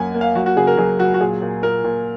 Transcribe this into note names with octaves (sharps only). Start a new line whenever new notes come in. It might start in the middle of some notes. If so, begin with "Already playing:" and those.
Already playing: F#2 A#3 F#5 G#5
A#3
F5
F#3 F#4
F#4
C#3 G#4
A#4
F#3 G#4
F#3 F#4
F#4
A#2 G#4
A#2
A#2 A#4
A#2